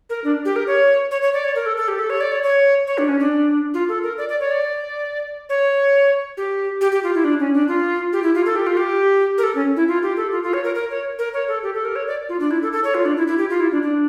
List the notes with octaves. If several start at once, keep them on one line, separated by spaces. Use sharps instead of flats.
A#4
D4
G4
A#4
C#5
C#5
C#5
D5
C#5
A#4
A4
A4
G4
A4
C#5
D5
C#5
C#5
C#5
D4
C#4
D4
F4
A4
A#4
D5
D5
C#5
D5
C#5
G4
G4
G4
F4
E4
D4
C#4
D4
F4
G4
E4
F4
A4
G4
F4
G4
A#4
A4
C#4
E4
F4
G4
A4
F4
F4
C#5
A#4
A#4
C#5
A#4
C#5
A4
G4
A4
A#4
C#5
D5
F4
D4
E4
A4
A4
C#5
F4
D4
E4
E4
G4
F4
E4
D4
D4